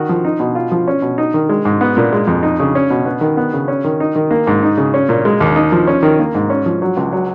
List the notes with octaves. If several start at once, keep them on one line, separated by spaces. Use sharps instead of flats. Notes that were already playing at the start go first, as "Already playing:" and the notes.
Already playing: D#3 F#4
F3
D#4
B2
F4
F3
C#4
B2
D#4
D#3
G#3
G#2
B3
A#2
G#3
F2
D#4
C#3
C#4
B2
B3
D#3
B3
C#3
C#4
D#3
D#4
D#3
A#3
G#2
D#4
C#3
C#4
A#2
G#3
D#2
D#4
F3
C#4
D#3
A#3
G#2
C#4
F3
F#3
C#2
F#3